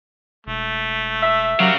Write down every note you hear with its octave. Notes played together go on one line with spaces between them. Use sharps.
E1 A3
E5
F#3 G3 C#4 F#4 A#4 F5